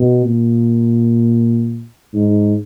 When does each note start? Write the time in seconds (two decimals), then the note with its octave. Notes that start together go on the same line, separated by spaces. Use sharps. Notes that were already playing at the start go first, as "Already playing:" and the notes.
Already playing: B2
0.26 A#2
2.14 G#2